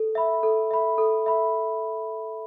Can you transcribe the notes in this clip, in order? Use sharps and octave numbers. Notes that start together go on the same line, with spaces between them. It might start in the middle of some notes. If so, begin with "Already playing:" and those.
Already playing: A4
E5 B5
A4
E5 B5
A4
E5 B5